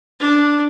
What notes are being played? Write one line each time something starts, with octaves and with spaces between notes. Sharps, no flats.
D4